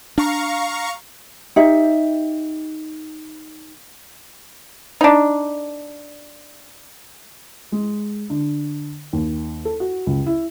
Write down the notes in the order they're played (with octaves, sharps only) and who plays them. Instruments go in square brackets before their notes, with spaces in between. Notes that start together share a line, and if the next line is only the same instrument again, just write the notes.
[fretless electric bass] D4 [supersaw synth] F5 A#5 C#6
[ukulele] D#4 G4 E5
[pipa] D4 D#4
[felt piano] G#3
D3
D#2
A4
F#4
C#2
E4